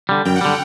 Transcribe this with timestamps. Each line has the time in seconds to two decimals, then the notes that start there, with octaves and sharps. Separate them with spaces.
0.09 D3 G3
0.25 F#2 G5
0.36 F#5
0.41 D3 G3